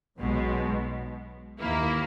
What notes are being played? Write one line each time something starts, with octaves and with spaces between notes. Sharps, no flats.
B1 B2 G#3
D#2 D#3 A#3 E4